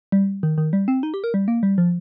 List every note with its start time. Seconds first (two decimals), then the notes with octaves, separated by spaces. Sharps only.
0.12 G3
0.43 D#3
0.58 D#3
0.73 G3
0.88 C4
1.03 D#4
1.14 G4
1.24 A#4
1.34 G3
1.48 A#3
1.63 G3
1.78 F3